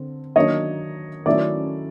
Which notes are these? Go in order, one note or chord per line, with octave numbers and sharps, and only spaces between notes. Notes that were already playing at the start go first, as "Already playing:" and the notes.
Already playing: D3 C4
D#3 F#3 A#3 D4 C#5 D#5
D#3 F#3 A3 C#4 E4 D5 E5